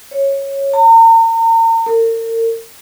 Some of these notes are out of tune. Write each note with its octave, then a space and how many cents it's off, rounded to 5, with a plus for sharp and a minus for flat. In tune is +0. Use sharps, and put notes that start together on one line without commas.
C#5 -10
A#5 -40
A#4 -40